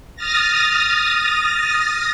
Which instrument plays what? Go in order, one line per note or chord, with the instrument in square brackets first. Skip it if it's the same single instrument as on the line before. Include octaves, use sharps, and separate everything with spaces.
[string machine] D#6 F6 A6 A#6